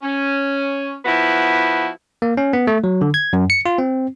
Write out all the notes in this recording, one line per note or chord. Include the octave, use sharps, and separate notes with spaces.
C#4
F3 B3 E4 F#4
A#3
C#4
B3
A3
F#3
D3
G#6
F#2
C#7
F4
C4